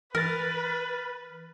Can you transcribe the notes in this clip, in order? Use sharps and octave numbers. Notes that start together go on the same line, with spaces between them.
E3 A#4 B4 F6 A6